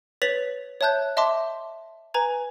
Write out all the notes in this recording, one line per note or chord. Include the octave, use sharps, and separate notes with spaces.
B4 C#5 A6 B6 F7 F#7
C#5 E5 A5 F#6 G6
D#5 E5 A5 C6 D6
B4 G#5 A#5 G#6